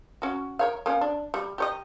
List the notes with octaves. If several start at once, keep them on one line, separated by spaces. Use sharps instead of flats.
C#4 F#4
A#4 C#5 F5
A#3 C#4
D4
G3
G4 C#5 D#5